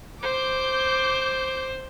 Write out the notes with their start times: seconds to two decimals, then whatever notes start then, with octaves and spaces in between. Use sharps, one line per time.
0.23 C5 D6 G6